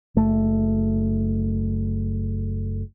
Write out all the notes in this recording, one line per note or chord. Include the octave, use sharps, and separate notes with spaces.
F#1 A3